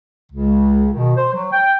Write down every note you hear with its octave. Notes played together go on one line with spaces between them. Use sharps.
C#2 C#3
B2 D#3
C5
F#3
G5